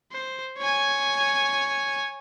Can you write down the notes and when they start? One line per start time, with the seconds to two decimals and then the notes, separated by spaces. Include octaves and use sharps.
0.11 C5
0.58 C#5 G#5